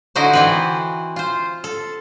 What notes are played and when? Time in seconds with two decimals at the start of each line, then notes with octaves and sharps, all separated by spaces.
0.15 D3 D#4 E4 F#4 C5
0.33 E3 C4 B4
1.16 F4 C5
1.64 A4